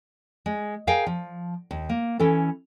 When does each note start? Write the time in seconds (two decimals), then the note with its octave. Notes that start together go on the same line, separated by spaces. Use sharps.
0.46 G#3
0.87 G#4 A#4 F5 G5 G#5
1.07 F3
1.71 D#2
1.89 A#3
2.19 E3 C#4 A4